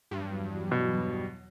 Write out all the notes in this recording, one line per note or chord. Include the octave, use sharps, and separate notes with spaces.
E2 G2 F#3
B2